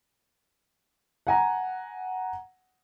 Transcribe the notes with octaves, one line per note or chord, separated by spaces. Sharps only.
F#5 G#5 A#5